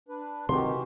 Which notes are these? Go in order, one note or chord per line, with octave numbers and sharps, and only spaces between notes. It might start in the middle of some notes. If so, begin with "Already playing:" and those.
D4 B4
C3 D#3 E3 F#4 G4 C6